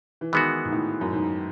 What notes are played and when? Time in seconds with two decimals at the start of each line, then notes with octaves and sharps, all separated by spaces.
0.21 E3
0.33 D#3 E3 G#3 B3 F#4
0.65 G#2
0.72 A2
1.01 F#2
1.13 G#2